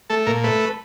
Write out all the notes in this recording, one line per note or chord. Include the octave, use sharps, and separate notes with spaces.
A3 A4
A#2 A#4
A3 B4